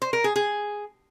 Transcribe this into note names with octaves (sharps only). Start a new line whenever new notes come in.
C5
A#4
G#4
G#4